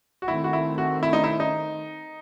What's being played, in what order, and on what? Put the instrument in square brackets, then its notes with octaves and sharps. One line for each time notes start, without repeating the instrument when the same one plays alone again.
[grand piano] F#4
[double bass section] D#3 A3 C4 [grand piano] E4
[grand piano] F#4
E4
F#4
E4
D#4
E4
D#4